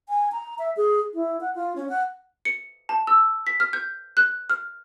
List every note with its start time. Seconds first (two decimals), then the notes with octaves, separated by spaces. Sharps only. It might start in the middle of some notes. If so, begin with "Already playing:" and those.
0.09 G#5
0.32 A#5
0.59 E5
0.77 G#4
1.14 E4
1.41 F#5
1.55 F4
1.76 C#4
1.89 F#5
2.45 C#7
2.89 A5
3.07 E6
3.47 B6
3.60 F6
3.73 G6
4.17 F#6
4.50 F6